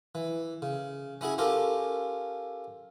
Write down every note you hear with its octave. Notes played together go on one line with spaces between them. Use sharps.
E3
C#3
C#4 E4 F#4 G#4
C#4 F4 G4 A4 A#4